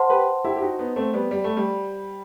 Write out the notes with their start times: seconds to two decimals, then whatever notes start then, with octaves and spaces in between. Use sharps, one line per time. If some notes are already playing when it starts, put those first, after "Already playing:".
Already playing: C5 F#5 A5 C6
0.10 G4 B4
0.45 E4 G4
0.56 G4
0.62 D#4 F#4
0.79 B3 D#4
0.96 A3 C4
1.13 G3 B3
1.31 G3
1.44 A3
1.57 G3